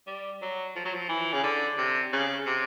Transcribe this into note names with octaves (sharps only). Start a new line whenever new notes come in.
G3
F#3
F3
F#3
F3
E3
C#3
D3
C3
C#3
C3